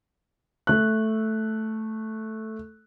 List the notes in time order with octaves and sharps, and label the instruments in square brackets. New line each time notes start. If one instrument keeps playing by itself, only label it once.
[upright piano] A3 F#6